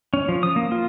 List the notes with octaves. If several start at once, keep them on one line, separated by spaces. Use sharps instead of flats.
C#4
F3
D#6
A#3
F4